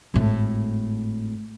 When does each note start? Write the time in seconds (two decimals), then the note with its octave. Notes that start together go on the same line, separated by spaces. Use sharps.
0.14 G#1 A2